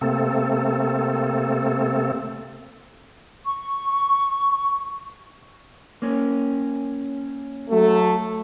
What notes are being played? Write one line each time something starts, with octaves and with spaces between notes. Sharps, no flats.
C3 A3 A#3 C4 A4
C#6
A#3 C#4
F#3 A3